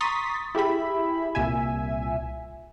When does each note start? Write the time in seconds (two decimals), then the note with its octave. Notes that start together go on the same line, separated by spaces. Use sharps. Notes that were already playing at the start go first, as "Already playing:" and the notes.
0.01 A#5 C6 C#6 D#6 A6 B6
0.55 E4 G4 G#4 E5 B5
1.35 C2 A#2 E5 G#5